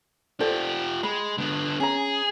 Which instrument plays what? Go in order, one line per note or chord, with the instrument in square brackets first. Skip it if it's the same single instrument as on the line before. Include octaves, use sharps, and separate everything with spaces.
[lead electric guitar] F4 G4 [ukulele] A4 C5 D5
[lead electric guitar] G#3 [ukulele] B5
[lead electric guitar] D3 B3
[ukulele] C#4 A#5 [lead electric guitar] G#4